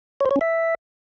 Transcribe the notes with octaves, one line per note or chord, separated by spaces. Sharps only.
C#5
C5
C#5
C#4
E5